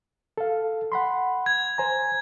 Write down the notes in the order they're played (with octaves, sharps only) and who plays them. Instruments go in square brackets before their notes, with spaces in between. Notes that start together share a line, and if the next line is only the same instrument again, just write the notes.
[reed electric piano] A4 F5
F#5 B5 C6
[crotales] G#6
[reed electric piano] C5 G#5 A#5